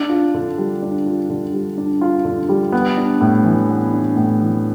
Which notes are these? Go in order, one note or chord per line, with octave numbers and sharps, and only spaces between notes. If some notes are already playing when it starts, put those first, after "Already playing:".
Already playing: D4
F4
D3
G3
D4
F4
D3
G3
D4
F4
D3
G3
B3
D4
A2
E3
B3
D4
A2
E3